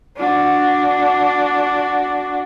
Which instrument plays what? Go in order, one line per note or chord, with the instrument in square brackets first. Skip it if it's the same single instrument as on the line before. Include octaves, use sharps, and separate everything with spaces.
[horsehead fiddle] D4 F#4